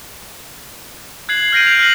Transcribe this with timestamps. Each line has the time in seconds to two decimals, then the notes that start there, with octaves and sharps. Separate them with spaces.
1.29 F#6 G#6 C7 F#7
1.53 F6 G6 A#6 C7 D7 D#7
1.67 F7
1.79 F6 F#6 B6 F#7